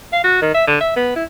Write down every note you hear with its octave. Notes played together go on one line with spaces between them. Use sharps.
F5
F#4
D#3
E5
D3
E5
B3
E4